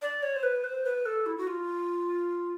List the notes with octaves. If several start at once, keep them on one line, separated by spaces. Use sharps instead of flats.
D5
C#5
C5
B4
C5
B4
A4
E4
F#4
F4